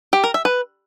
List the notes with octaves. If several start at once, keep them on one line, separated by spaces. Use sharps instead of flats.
G4
A#4
E5
B4